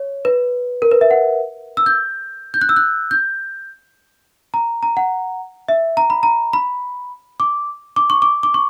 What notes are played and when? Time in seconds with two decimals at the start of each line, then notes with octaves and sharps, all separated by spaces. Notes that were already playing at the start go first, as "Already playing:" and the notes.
Already playing: C#5
0.25 B4
0.82 A#4
0.91 B4
1.01 E5
1.11 F#5
1.77 E6
1.86 G6
2.54 G6
2.61 F#6
2.69 E6
2.76 F#6
3.11 G6
4.54 A#5
4.83 A#5
4.97 F#5
5.69 E5
5.97 A#5
6.10 B5
6.23 A#5
6.53 B5
7.40 D6
7.96 D6
8.10 C#6
8.22 D6
8.43 D6
8.54 C#6